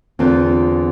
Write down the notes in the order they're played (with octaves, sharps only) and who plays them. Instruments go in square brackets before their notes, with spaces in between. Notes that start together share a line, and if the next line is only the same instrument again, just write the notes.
[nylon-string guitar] E2 D3 C4 F4